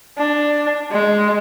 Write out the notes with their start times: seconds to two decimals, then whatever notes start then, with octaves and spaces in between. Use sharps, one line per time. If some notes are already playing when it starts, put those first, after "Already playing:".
0.18 D4
0.91 G#3